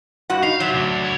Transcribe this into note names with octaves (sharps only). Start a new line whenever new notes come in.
G2 F#4 F#5
D#4 F5
F#3 C5 E5
D2 D3
E4 C#5